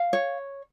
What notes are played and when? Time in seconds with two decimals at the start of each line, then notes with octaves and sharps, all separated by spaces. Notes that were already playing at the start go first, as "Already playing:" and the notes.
Already playing: F5
0.13 C#5